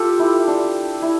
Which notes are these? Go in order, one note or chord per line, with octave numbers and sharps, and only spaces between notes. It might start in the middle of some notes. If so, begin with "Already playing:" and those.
Already playing: F4 G4 A4
E4
D4
E4